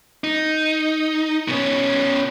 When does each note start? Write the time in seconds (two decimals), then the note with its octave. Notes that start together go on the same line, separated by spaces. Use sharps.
0.24 D#4
1.48 B2 C#4